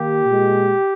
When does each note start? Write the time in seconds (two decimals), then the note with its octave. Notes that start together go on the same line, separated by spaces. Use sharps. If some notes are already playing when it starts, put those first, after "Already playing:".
Already playing: D#3 A#3 G4
0.25 A#2 G#3